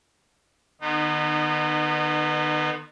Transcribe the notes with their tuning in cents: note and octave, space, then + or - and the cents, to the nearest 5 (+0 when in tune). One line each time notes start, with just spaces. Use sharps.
D#3 -45 B3 +0 D#4 -30